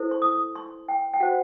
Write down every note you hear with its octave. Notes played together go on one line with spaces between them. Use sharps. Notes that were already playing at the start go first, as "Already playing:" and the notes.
Already playing: E4 A4 C5
C6
D#6
C6
G5
G5
F#4 C5 F#5